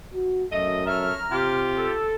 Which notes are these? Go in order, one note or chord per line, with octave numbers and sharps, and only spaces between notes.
F#4
F#2 A3 D#5
A4 C#5 E5 A#5 F6
C3 F4 G4
A4